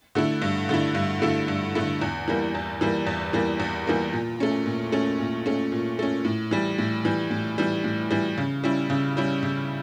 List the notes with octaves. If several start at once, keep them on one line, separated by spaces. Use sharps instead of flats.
D3 A3 E4
G2
D3 A3 E4
G2
D3 A3 E4
G2
D3 A3 E4
E2
E3 G3 A#3
E2
E3 G3 A#3
E2
E3 G3 A#3
E2
E3 G3 A#3
A#2
A3 C#4
A#2
A3 C#4
A#2
A3 C#4
A#2
A3 C#4
A2
E3 G3
A2
E3 G3
A2
E3 G3
A2
E3 G3
C#3
G3 C#4 E4
C#3
G3 C#4 E4
C#3